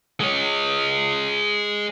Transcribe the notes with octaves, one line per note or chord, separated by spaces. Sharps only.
G#3 C#5